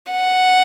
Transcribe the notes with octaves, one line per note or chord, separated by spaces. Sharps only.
F#5